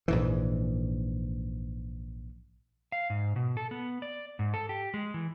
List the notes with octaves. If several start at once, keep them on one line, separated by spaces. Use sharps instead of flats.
A#1 G#2 E3
F5
G#2
B2
A4
B3
D5
G#2
A4
G4
G#3
E3